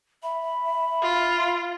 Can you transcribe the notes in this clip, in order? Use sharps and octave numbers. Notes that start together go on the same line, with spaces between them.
E5 B5
F4